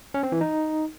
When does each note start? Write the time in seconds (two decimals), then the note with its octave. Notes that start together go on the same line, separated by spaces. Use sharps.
0.14 C#4
0.23 C4
0.32 E3
0.41 D#4